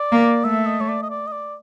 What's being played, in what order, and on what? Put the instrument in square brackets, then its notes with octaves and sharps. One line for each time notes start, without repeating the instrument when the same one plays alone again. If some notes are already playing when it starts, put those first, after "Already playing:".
Already playing: [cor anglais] D5
[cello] A#3
[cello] A3 [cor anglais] E5
[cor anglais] D#5
C#5
D5
D#5
D5
D#5
D5